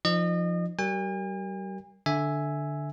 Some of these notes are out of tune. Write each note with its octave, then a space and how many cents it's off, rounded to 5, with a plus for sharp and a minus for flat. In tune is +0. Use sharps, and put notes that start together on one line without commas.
F3 +0 D#4 +0 D#5 -35
G3 -35 A#4 +0 G#5 -45
D3 +0 E5 +0 G#5 +0